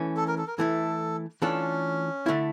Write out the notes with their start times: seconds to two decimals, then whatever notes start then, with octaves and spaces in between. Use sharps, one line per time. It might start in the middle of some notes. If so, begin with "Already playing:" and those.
Already playing: E3 A3 C#4
0.17 A4
0.28 A#4
0.38 A4
0.47 A#4
0.58 E3 A3 E4 A4
1.42 E3 A3 C#4 D4 F4 A4
2.26 D3 A3 E4